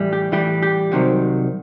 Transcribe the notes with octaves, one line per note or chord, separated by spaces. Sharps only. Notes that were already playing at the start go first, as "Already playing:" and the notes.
Already playing: A2 E3 G3
G4
A2 E3 G3 G4
G4
C2 C3 D#3 F#3